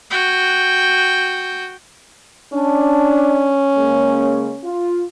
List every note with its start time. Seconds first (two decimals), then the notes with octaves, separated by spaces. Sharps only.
0.10 F#4 G5
2.53 C#4 D4
3.76 C#3 G#3 A#3
4.64 F4